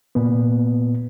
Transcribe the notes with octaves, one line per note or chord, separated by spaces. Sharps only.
A#2 B3